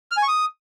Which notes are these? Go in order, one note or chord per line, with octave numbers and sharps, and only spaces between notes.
F6
G#5
C#6
D#6